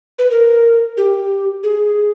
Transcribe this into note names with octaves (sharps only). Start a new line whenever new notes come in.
B4
A#4
G4
G#4